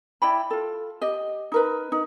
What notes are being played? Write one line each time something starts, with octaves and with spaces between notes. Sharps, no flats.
E4 D5 G5 B5
F4 A4
G4 D#5
D#4 A#4 B4
D#4